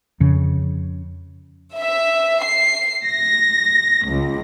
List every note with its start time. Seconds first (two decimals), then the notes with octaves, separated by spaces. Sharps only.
0.20 F2 C#3
1.75 E5
2.42 C7
3.04 A#6
4.08 C#2